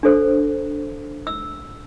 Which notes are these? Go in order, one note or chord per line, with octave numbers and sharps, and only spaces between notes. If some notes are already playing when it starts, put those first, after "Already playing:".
D4 A4 C5
E6